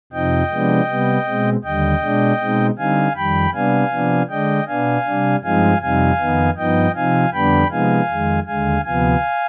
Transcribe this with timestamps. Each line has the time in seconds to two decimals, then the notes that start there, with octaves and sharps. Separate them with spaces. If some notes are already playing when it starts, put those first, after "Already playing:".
0.13 F2 C3 F3 C4 D#4 D#5 G5
0.51 C3 F3 G#3 B3 D4
0.88 C3 G3 B3
1.26 B2 G#3 C4
1.64 D#2 D3 G3 D#5 G5
2.02 B2 G#3 D4
2.40 B2 G#3 C4 D#4
2.78 D3 G3 C4 D#4 F5 G#5
3.16 F2 D#3 G3 G5 B5
3.54 C3 G3 B3 D4 F5 G#5
3.92 C3 F3 B3 D4
4.30 D3 G#3 D4 D#5 G5
4.67 B2 B3 D4 F5 G#5
5.05 C3 G3 D4
5.44 G2 F3 G#3 C4 D#4 F5 G#5
5.82 F2 C3 G3 C4 D#4 F5 G#5
6.20 F2 D#3 B3 D#4
6.57 G2 F3 B3 D#4 D#5 G5
6.95 C3 F3 C4 D#4 F5 G#5
7.33 F2 D3 G3 B3 D4 G5 B5
7.71 C3 F3 G#3 B3 D#4 F5 G#5
8.09 F2 D#3 G#3
8.47 D#2 D3 G#3 F5 G#5
8.85 D2 C3 F3 B3 F5 G#5